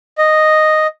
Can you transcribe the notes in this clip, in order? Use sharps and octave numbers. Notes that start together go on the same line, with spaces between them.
D#5